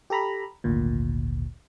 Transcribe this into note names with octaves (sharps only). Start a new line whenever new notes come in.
G4 A4 A#5 B5
G#1 D2 A#2